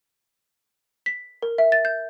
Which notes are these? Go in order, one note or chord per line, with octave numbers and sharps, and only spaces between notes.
B6
A#4
E5
A6
G6